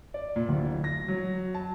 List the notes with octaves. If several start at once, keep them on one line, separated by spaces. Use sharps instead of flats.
D5
A#2
D1
A#6
F#3
A5